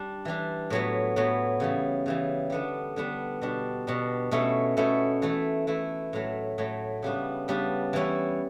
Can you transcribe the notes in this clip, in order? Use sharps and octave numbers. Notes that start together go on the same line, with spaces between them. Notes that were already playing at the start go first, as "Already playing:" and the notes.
Already playing: G3 D4
E3 G3 D4
A2 F#3 B3
A2 F#3 B3
C#3 E3 G3
C#3 E3 G3
D3 G3 B3 D4
D3 G3 B3 D4
B2 G3 D4
B2 G3 D4
B2 A3 C#4 E4
B2 A3 C#4 E4
E3 A3 E4
E3 A3 E4
A2 F#3 A3
A2 F#3 A3
C#3 G3 B3 D4
C#3 G3 B3 D4
E3 G3 C#4 E4